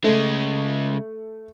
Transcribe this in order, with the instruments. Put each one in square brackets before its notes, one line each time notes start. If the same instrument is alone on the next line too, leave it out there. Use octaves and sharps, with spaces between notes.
[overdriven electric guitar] C#3 G#3 [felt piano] A3